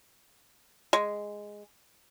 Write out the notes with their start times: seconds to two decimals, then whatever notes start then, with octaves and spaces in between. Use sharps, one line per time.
0.93 G#3